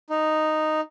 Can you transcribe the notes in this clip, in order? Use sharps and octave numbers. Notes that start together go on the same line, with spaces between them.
D#4